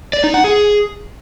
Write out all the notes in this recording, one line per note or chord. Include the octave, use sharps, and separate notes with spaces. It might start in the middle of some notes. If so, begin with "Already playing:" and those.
D5
D#4
F#5
G#4